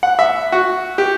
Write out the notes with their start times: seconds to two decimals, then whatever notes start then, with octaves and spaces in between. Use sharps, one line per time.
0.03 F#5
0.19 E5
0.52 F#4
0.98 G4